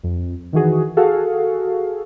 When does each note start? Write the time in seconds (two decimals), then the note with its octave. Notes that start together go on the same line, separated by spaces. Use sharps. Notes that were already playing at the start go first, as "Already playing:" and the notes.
0.03 F2
0.53 D#3 E3 F#4 G#4
0.97 F#4 G#4 A4 F5